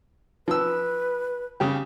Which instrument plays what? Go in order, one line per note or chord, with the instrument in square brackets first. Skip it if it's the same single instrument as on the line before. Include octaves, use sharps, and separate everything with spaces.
[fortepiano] F3 E6 [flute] B4
[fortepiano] C#3 G3 G4